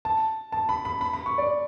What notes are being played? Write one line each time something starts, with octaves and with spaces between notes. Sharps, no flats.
A5
A5
B5
B5
B5
B5
C#6
D5